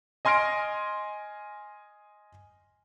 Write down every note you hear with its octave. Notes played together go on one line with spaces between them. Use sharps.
D#5 G#5 C6 F6 A#6 D7